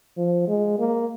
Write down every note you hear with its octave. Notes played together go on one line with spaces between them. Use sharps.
F3
G#3
A#3